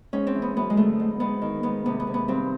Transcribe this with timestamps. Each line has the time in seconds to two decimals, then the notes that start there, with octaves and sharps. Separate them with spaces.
0.13 G#2 C#4
0.27 C4
0.35 E3
0.42 B3
0.56 F#2 B3
0.70 G#3
0.77 D3 A3
1.00 G#2
1.20 G#2 B3
1.42 D#3
1.63 G#2 B3
1.86 C3 B3
2.00 B3
2.07 C3
2.14 B3
2.28 G2 C4